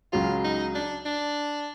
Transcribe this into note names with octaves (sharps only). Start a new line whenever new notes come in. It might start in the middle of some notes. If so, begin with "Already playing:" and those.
C#2 C#3 F#3 F4
D#4
D4
D4